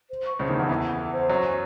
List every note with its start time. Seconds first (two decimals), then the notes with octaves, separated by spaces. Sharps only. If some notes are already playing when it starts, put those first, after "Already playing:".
0.09 C5
0.25 C#6
0.39 C#2 C#3 C5
0.49 D#2 D#3
0.55 E2 E3 F#5
0.69 E2 E3 A4
0.84 F#5
0.99 A4
1.14 C5
1.29 F#2 F#3 C#6
1.44 G#5